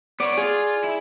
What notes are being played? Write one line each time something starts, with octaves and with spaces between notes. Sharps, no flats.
B3 C#5 D5
F4 G#4
E4